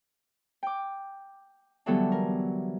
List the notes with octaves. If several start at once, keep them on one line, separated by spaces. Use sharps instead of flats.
G5 D6
D3 E3 F#3 G3 B3 A4
A#4